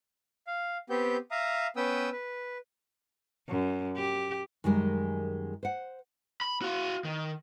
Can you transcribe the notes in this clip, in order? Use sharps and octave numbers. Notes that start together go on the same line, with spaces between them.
F5
B3 C4 G4 G6
E5 F5 A#5 D#6
B3 C#4 B4 G5 D#6 E6
B4
F#2
G4
F#2 D#3 G3 G#3 A#4
C5 F#5
B5
F#4 F5
D#3